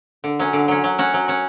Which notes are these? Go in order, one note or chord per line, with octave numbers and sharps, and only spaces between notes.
D3
F#3 C#4
D3
F#3 C#4
F#3
C#4 F#4
F#3
C#4 F#4